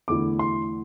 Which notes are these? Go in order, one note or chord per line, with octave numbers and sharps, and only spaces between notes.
E2 D3 A3 E4 D6
C6